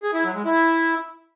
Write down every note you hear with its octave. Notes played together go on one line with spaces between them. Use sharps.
G#4
E4
F#3
G#3
E4